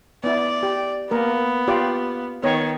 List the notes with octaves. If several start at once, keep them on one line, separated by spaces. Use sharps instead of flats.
B3 E4 D5
G4
A#3 B3 A#4
F4 G4 D5
D#3 B3 C#5